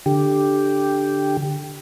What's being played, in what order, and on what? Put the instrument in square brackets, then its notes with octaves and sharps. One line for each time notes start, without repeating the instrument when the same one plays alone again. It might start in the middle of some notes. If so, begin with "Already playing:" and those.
[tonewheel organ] D3 G4